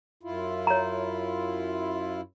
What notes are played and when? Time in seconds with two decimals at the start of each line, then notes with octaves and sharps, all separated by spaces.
0.23 F#2 E4 F4
0.67 C#5 A#5